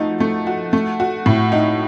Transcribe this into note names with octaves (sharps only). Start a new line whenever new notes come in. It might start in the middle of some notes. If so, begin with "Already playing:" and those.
Already playing: F3 A3 D#4 F#4
A3
F#4
A3
F#4
A2
D#4